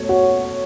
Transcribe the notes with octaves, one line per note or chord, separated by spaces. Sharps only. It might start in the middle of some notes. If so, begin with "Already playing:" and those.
Already playing: B2 A3 C#5
F#4